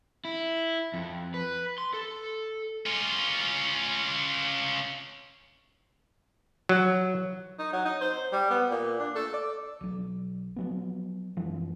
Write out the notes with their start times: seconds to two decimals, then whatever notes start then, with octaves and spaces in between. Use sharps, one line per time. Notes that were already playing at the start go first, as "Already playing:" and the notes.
0.25 E4
0.94 F2
1.34 B4
1.78 C6
1.93 A4
2.86 C#4 F4
6.69 F#3
7.59 D#4
7.72 F#3
7.85 D#4
8.01 C5
8.32 G3
8.50 B3
8.71 A#2
8.99 D4
9.15 A4
9.33 D5
9.81 B1 F#3
10.56 F3 F#3 B3
11.37 F#2 E3 F3 G#3